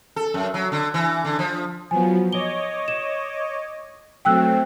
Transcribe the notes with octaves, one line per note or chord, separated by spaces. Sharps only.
A4
F#2
F#3
D3
E3
D3
F3
F3 F#3 B3 G#5
C#5 D#5 D6 G7
E7
F#3 A3 C4 G5 E6 F#6